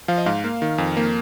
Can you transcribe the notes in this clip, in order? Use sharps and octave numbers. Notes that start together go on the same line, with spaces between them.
F3 F5
D#5
G#2 F5
A#3
D#3
F2
A#3